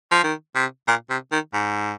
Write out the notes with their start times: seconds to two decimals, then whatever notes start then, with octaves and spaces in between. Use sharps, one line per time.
0.11 F3
0.23 D#3
0.55 C3
0.87 A#2
1.10 C3
1.32 D#3
1.53 G#2